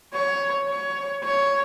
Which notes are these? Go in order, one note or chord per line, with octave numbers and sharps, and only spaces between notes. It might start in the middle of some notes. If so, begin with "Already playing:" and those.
C#5
C#5
C#5